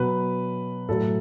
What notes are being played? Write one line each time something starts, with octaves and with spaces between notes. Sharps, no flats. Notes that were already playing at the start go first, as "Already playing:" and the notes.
Already playing: B2 F#3 B4
A2 F#3 A4